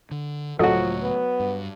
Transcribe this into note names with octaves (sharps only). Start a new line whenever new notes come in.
D3
C#2 A2 F3 F#3 F#4 A4 D#5
B3
G2